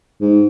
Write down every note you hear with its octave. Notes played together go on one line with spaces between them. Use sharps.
G#2